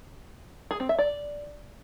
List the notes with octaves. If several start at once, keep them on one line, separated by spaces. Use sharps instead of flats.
G#4
C4
E5
D5